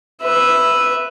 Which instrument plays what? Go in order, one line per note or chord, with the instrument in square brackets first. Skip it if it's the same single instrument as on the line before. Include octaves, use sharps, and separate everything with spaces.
[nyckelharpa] B4 E5